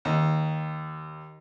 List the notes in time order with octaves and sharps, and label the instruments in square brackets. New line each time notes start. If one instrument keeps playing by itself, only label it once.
[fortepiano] D#2